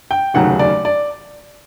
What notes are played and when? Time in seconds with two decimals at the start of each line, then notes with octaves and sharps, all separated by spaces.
0.11 G5
0.34 F1 D#2 C#3 F#3 F#5
0.59 D5
0.85 D5